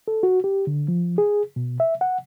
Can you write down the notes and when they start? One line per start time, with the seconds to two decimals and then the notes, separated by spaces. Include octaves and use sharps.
0.08 A4
0.23 F#4
0.44 G4
0.67 D3
0.88 F3
1.18 G#4
1.56 B2
1.80 E5
2.01 F#5